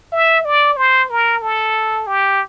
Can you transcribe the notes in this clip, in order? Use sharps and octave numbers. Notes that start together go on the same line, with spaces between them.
E5
D5
C5
A#4
A4
G4